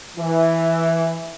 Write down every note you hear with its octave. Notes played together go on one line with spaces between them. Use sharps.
E3